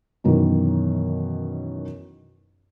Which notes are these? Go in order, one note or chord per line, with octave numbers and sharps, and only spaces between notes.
F#2 B2 D#3 E3